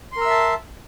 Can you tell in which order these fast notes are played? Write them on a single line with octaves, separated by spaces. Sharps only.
C6 A#4 E6 E5 A5